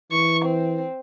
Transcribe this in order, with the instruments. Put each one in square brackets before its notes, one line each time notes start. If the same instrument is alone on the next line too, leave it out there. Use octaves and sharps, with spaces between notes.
[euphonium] E3 [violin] C#6
[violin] C4